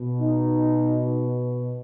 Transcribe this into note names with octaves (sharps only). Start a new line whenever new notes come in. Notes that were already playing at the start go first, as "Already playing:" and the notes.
Already playing: B2
D#4